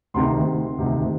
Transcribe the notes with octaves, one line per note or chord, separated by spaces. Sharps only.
D2 C3 D#3 C6
D2 C3 D#3